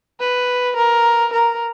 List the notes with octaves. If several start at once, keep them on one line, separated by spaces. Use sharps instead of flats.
B4
A#4
A#4